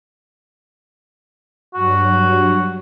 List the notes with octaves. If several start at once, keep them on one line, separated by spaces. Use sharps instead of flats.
G2 F#3 F#4